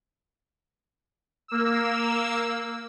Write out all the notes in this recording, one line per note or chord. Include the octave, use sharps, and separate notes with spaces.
A#3 E6